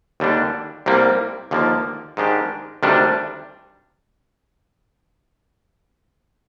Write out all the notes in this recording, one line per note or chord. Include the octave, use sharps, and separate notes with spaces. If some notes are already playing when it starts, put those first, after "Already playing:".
D#2 D3 G3 D4
C2 C3 G3 A#3
D#2 D3 F3 A#3
G#2 D#3 G#3 D4 G4
D2 C3 D#3 G3 D4